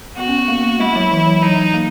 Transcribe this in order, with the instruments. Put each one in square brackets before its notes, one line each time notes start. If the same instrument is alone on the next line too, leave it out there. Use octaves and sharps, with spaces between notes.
[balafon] B3 [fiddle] F#4
[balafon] C#4
B3
A#3
[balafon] G#3 [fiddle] E4
[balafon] F#3
E3
F#3
[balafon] F#3 [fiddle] D#4
[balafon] A#3